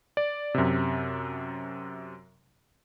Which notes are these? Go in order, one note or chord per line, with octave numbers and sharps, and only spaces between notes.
D5
F#2 C3